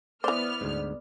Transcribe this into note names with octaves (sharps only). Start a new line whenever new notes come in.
E3 B3 C5 D5 F6
D2 G#2